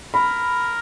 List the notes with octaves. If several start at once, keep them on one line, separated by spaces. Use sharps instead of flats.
A#4 B5